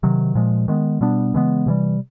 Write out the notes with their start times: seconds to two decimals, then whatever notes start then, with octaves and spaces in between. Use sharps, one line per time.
0.03 C3 D#3 F#3
0.35 A#2 F3 G#3
0.68 D#3 G#3 B3
1.01 B2 G3 B3 D4
1.34 C#3 E3 G#3 B3
1.66 C3 E3 G3